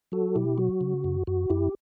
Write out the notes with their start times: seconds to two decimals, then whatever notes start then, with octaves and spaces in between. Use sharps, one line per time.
0.12 F#3 F#4 A4
0.35 B2 E4 G4
0.58 F#3 F#4
0.81 C#3
1.04 F#2
1.27 F#2 F#4
1.50 F#2 E4 G4